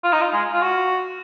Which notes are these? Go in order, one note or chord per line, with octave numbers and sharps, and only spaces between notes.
F4
D#4
F4
G#3
F4
F#4